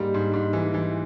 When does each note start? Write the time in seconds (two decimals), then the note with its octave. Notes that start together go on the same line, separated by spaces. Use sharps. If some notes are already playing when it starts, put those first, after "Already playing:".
Already playing: G#2 G3 A#3
0.14 G#2
0.33 G#2
0.53 E3
0.74 E3